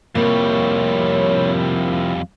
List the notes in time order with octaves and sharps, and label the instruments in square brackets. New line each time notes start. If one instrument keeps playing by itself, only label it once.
[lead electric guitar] F2 G3 [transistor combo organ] C3 F3 E4 [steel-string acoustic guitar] A#3 [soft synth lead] C#5